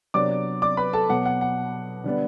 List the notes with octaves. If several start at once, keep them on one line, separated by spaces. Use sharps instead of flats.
C3 F#3 B3 D4 D5 D6
D5 D6
B4 B5
A4 A5
B2 F#3 B3 F#5
F#5
F#5
D3 G3 B3 D4